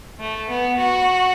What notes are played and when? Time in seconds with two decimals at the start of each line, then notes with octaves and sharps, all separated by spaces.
0.19 A3
0.49 B3
0.77 F#4